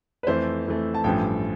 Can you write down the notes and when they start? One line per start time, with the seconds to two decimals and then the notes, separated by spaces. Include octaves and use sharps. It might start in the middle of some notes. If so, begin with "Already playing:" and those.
0.23 B4
0.27 F2 E3 A3 C5
0.66 F2 E3 A3
0.94 A5
1.04 A1 G2 F3 A3 G5